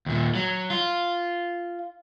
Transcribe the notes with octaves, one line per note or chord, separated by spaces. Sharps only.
D#2 A#2
F#3
F4